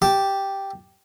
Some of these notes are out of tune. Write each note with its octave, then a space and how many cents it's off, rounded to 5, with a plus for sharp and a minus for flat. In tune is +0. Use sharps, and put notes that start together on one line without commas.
G4 +0 A5 +0